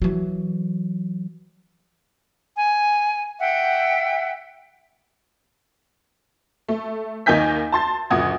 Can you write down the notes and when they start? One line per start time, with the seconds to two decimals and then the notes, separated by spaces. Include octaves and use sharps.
0.02 E3 F#3
2.56 G#5
3.39 E5 F#5 G5
6.69 A3
7.26 D#2 A#3 D#4 G#5 G6 B6
7.72 A5 C6 A6
8.10 F#1 D2 A#2 F#5 D#6 G#6